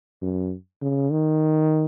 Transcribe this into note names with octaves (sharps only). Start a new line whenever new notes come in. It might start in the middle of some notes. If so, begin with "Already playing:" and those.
F#2
C#3
D#3